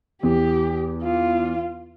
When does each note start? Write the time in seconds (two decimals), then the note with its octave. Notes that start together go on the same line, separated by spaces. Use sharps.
0.23 E2 G4
1.03 F4